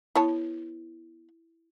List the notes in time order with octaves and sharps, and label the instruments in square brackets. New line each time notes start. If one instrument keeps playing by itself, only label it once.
[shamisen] B3 C#5 A5 [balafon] E4